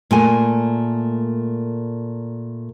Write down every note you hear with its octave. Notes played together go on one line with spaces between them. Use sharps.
A#2 A3 G#5